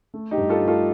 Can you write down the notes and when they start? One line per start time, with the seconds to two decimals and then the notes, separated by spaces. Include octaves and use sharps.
0.14 A3
0.31 D#4 G4
0.37 G2
0.49 F4 A4
0.61 A3
0.67 F4 A4